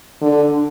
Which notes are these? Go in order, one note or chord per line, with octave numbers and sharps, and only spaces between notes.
D3